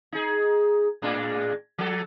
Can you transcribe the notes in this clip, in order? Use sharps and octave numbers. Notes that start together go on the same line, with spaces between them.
D#4 G#4
A2 G#3 D4
F3 A4